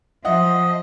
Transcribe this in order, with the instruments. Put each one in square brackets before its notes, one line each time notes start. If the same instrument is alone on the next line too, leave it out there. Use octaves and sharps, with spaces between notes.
[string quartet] F3 [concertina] D#5 [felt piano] E5 F#5